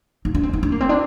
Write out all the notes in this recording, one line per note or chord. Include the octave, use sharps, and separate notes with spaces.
D#4
D4
C4
D#4
D4
A#3
C4
D4